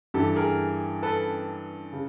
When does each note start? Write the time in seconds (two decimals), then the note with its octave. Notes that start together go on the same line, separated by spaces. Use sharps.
0.14 G2 E3 G4 A4
0.36 G#4 A#4
1.03 A4 B4
1.93 C#3